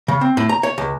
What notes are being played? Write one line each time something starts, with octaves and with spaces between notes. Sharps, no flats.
C#3
C4
A2
A#5
C#5
C#2